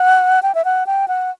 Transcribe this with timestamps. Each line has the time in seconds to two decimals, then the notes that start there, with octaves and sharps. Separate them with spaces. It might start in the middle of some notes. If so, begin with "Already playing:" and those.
Already playing: F#5
0.43 G5
0.55 E5
0.65 F#5
0.87 G5
1.08 F#5